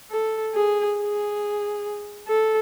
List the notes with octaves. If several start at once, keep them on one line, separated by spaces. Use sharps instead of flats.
A4
G#4
G#4
A4